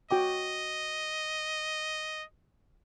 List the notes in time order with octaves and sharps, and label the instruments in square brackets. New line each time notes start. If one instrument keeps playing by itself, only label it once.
[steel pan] F#4 G5 D6 [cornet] D#5